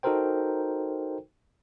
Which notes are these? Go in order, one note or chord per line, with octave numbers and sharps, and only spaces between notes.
D#4 F#4 A4 A#4 C5 G5